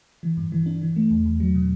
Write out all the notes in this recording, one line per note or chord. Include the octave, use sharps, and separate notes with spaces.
E3
G2
E3
D4
E3
A3
E2
E2
F#3
B2